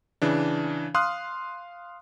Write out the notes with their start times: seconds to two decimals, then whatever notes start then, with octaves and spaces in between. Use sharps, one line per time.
0.22 C#3 E3 D4
0.95 F5 C6 D#6 F6 F#6